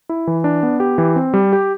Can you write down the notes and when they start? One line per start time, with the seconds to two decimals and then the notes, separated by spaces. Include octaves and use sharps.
0.09 E4
0.27 E3
0.44 D4
0.63 B3
0.80 G4
0.98 E3
1.16 C4
1.34 G3
1.53 G4